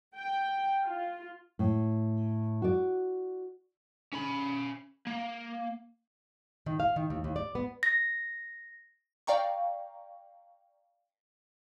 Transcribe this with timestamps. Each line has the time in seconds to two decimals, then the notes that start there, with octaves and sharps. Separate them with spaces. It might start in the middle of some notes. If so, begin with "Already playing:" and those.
0.16 G5
0.84 F4
1.59 A2
2.62 F#4 D5
4.13 C#4 B5
5.07 A#3
6.66 D#3
6.80 F5
6.96 D#3
7.10 D#2
7.24 D#2
7.36 D5
7.55 B3
7.83 A#6
9.27 D5 F5 G5 A#5 C#6